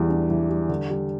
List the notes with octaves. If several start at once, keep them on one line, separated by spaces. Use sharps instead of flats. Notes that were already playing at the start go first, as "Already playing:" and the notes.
Already playing: E2 E3 G3
D4
E3
G3
D3
G3